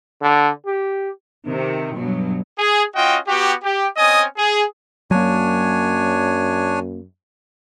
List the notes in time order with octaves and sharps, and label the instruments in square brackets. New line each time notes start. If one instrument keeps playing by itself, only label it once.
[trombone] D3
G4
[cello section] C3 D#3
G2 B2 F#3
[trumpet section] G#4
C#4 F4 F#4 D#5 G5
B3 F#4 G4
G4
C4 C#4 D#5 G#5 D#6
G#4
[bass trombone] F#2 [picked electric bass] F#3 A#3 [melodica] D4 C#5 G#5